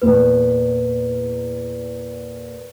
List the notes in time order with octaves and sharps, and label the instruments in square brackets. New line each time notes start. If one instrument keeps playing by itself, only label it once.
[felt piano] E2 A#2 [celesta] B4